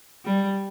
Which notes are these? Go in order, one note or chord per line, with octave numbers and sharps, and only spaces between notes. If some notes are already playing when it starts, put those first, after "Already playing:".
G3